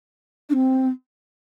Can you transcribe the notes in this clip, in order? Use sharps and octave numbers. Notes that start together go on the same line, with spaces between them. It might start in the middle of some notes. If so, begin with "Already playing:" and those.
D4
C4